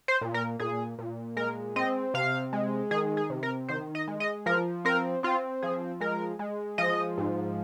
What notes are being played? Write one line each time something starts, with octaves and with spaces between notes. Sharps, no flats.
C5
A#2
A#4
A#2 G#4
A#2
G#3 A#4
C4 D#5
C3 F5
G#3
D#3 G#4
G#4
C3
A#4
D#3 C5
D#5
G#3
D#5
F3 A#4
C4 A#4
C4 F4
F3 G#4
G#3 A#4
G#3
F3 D#5
G#2